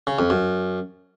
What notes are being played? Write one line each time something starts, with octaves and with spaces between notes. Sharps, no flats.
C#3
F2
F#2